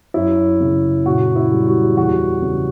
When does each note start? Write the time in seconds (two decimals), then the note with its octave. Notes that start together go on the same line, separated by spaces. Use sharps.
0.14 F#2 E4
0.60 C#3
1.05 A#2 F#4
1.36 E4
1.52 G3
1.67 F#4
1.96 E2 F#4
2.42 C#3